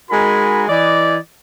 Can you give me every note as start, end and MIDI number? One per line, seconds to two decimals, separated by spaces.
0.10 0.64 56
0.10 0.64 63
0.10 0.64 66
0.10 0.64 70
0.10 0.64 80
0.10 0.64 83
0.68 1.16 52
0.68 1.16 74
0.68 1.16 75